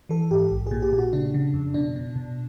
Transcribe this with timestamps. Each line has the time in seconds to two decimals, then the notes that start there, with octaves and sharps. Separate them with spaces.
0.09 E3 A4
0.31 G#2 G4
0.51 A#1
0.67 A#2 G#4
0.82 G4
0.93 A#2
0.98 F#4
1.13 C#3 D4
1.34 C#3
1.54 F2
1.74 B2 D4
1.96 B2
2.16 B2